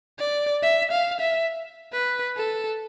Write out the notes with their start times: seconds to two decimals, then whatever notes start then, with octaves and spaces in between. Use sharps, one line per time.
0.19 D5
0.63 E5
0.92 F5
1.20 E5
1.92 B4
2.37 A4